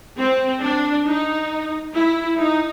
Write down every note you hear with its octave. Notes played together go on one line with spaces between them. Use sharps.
C4
D4
D#4
E4
D#4